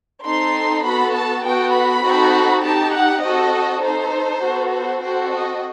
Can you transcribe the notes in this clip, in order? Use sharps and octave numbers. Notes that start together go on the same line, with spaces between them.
C4 D#4 A4 C6
B3 F#4 A4 B5
A5
B3 F#4 A4 G5
B5
C4 D#4 F#4 A4
D#4 G4 A5
F#5
C4 F#4 A4 D#5
D#4 A4 C5
B3 F#4 A4
C5
C4 F#4 A4 C5
D#5